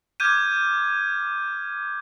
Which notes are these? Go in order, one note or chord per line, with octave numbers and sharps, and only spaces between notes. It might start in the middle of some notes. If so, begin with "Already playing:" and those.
D6 F6 G6 G#6 D#7